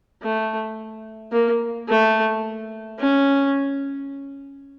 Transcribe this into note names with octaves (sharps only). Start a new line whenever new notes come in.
A3
A#3
A3
C#4